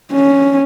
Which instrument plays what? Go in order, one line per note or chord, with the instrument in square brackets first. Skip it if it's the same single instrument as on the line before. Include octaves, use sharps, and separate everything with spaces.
[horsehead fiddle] C#4